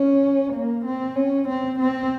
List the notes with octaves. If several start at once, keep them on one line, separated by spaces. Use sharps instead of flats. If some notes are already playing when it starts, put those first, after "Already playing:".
Already playing: C#4
A#3
C4
C#4
C4
C4